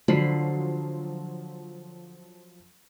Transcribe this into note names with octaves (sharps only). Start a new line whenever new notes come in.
D3 F3 F#3 B5 C7